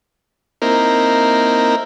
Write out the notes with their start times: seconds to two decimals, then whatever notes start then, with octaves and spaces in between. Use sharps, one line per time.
0.62 A#3 C4 D#4 E4 A#4